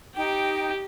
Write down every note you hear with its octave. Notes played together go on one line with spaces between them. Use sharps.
D#4 G4 G5